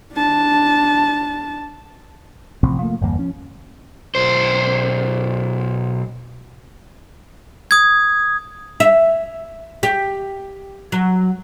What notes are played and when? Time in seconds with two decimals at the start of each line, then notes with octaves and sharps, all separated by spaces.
0.13 D4 A5
2.63 A1 C3 F3 C4
2.82 C3 F3 A3 A#3
3.01 G1 E2 G2 A#3
3.19 F3 C#4
4.15 B1 C5
7.71 D#6 G#6
8.80 E5
9.83 G4
10.92 F#3